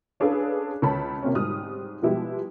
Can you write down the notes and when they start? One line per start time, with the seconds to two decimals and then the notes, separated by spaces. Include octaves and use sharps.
0.20 C#4 D4 G#4 A4 B4 F5
0.82 C#2 C#5 A5 B5
1.23 C3 A#3 C4 C#4
1.35 G#2 G3 D#6 F6
2.02 B2 F3 G3 G#3 E4 G4